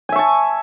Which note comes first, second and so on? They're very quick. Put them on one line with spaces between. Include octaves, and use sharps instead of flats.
G#5 E5 C#6 A5